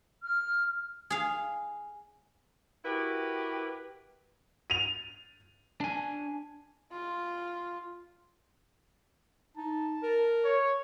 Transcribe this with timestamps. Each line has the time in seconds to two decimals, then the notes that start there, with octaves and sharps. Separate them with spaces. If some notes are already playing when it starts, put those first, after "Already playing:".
0.23 F6
1.10 G#4 F5
2.84 E4 F#4 G4 A#4 B4
4.70 D#7 F7
5.81 D4 G#5
6.91 F4
9.57 D#4 A5
10.03 A#4
10.45 C#5